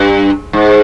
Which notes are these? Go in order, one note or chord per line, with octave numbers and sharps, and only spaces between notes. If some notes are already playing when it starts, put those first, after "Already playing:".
Already playing: G2
G#2